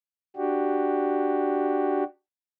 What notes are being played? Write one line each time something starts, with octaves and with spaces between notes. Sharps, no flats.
D4 F#4 G4